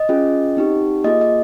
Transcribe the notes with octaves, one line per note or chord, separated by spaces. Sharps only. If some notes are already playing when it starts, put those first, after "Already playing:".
Already playing: D#5
C#4 F4 G#4
C4 D#4 G4
A#3 F4 G#4 D#5
D#5